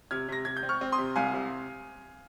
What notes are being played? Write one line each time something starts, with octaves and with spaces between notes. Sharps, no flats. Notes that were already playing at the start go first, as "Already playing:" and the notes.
C3 F6 G#6
C3 A#6
C3 G#6
G6
C4
C#6 F6
C4
C6 D#6
C3
C2 F5 G#5
C3